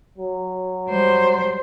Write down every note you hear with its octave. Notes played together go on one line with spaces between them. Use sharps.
F#3
G3 C5